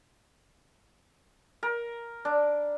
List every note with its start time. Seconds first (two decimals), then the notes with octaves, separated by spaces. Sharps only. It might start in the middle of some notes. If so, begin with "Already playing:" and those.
1.63 A#4
2.25 D4